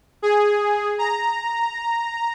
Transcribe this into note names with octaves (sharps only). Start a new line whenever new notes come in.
G#4
A#5